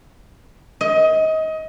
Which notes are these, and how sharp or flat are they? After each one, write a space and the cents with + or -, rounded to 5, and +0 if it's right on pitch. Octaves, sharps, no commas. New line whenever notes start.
D#5 +25